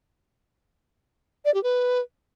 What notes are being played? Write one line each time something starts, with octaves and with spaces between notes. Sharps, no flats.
D5
G4
B4